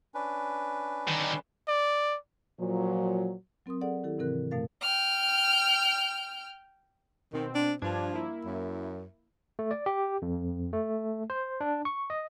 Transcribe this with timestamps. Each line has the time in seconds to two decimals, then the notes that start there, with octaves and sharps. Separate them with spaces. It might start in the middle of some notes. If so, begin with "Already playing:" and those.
0.14 C#4 D4 B4
1.08 D3 D#3
1.68 D5
2.59 A#2 F3 F#3
3.66 F#3 C4 A#4 C6 D#6
3.81 G#4 A4 D5 F#5
4.04 D#3 E4 G4 A4
4.18 G#2 C3 E3 C4 A#4 F#6
4.51 F#2 B2 A3 A#4 F5 A6
4.82 G5 F6
7.33 B2 D#3 C4
7.55 D4
7.82 G2 F3 D4 G#6
8.13 A#3 E4
8.45 F#2
9.59 A3
9.71 D5
9.86 G4
10.22 F2
10.73 A3
11.30 C5
11.61 D4
11.85 C#6
12.10 D#5